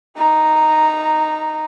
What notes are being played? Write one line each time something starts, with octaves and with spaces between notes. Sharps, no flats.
D#4 A#5